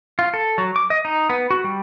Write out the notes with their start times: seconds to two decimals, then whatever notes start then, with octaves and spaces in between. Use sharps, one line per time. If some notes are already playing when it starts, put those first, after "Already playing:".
0.19 F4
0.34 A4
0.58 F#3
0.76 D6
0.90 D#5
1.05 D#4
1.30 B3
1.51 F#4
1.64 G3